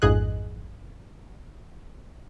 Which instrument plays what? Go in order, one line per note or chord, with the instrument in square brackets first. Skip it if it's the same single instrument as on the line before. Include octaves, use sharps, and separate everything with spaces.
[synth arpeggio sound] A1 F2 G#2 G#4 D#5 F#6